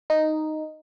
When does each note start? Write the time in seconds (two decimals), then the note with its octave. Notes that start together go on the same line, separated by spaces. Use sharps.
0.10 D#4